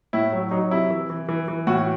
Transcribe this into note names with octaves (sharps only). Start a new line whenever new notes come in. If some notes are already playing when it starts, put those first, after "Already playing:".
A2 E4
F#3
F#3 D#4
C3 E4
E3
E3
E3
E3
A2 F#4